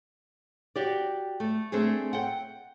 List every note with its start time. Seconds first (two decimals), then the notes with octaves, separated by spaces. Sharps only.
0.76 F#4 G4 D5
1.40 A3
1.72 A3 C4 D4 G#4
2.13 F#5 G5